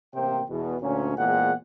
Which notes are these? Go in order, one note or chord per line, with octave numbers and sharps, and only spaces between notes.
A1 C3 A#3 C5 G5
E2 B2
D2 A#2 C#4
E2 A#2 G#3 C4 F#5